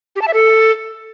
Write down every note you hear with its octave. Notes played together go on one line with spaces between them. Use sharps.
G4
A5
E5
A4